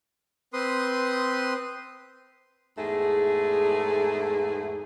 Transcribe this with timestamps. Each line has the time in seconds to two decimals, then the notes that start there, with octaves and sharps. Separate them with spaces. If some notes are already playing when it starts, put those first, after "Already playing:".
0.53 C4 B4 C6 D#6
2.76 E2 G#2 A3 G#4